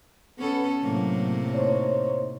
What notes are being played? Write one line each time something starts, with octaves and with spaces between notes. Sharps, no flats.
B3 C#4 A4
A2 C3 F#3 A#3
D#4 C5 C#5